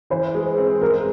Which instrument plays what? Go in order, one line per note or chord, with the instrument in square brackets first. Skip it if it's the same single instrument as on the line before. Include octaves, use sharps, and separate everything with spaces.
[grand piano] E3 [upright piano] C5
[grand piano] G#3
C4
[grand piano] G#3 [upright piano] A#4